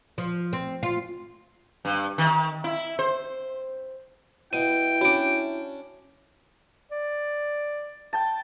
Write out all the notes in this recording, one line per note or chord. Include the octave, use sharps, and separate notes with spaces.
F3
C4
F4
G2
D#3
E4
C5
B2 E4 G5 D#7
C#4 D4 F#4 D7
D5
G5 A5